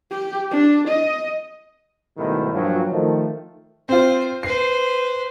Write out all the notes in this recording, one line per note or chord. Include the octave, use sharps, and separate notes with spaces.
G4
D4
D#5
G#2 B2 D#3 G3 A3 E4
G2 A#2 F3 F#3
D#3 F3 A3
C4 F4 C5
B4 C5 C7